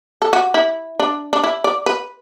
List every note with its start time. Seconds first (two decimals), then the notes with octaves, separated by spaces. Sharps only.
0.22 A4
0.33 F#4
0.54 E4
0.99 D4
1.33 D4
1.44 E4
1.64 D5
1.86 B4